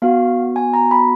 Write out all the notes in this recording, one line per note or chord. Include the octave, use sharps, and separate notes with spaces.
B3 F#4 F5
G#5
A#5
B5